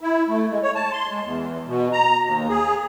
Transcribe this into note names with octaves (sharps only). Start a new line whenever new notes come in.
E4
A3
G#3
C#5
A5
C6
G#3
E2
B2
A#5
D#2
G#4